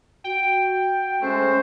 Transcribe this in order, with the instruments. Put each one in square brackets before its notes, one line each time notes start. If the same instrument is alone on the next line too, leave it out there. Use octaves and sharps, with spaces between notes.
[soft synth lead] F#4 [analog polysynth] G5
[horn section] G#3 A3 C5 [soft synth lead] C#4